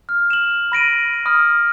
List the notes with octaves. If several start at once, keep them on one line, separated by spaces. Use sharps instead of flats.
F6
E7 F#7
B5 A#6 D7 D#7
B5 D#6 F6